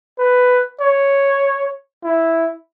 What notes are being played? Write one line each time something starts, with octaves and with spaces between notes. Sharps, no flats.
B4
C#5
E4